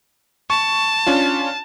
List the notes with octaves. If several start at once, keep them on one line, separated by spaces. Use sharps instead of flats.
A5 C#6
C#4 D4 F4